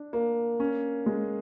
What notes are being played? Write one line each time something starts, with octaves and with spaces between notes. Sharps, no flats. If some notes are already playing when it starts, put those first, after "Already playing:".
Already playing: D4
A#3
C#4
G#3